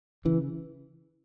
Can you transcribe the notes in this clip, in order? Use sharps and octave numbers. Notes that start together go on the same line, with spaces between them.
C#3 E3